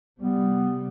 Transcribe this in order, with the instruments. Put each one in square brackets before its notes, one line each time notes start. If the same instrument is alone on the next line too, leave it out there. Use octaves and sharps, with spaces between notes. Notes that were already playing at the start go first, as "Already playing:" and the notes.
[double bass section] C3 G3 [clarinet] B3